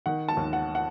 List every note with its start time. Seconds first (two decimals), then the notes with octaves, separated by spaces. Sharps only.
0.06 D#3 F#5
0.28 A5
0.37 D#2
0.53 F#5
0.75 F#5